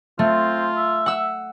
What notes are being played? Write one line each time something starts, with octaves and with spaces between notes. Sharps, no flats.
A3 C4 F4
E5
F#5 E6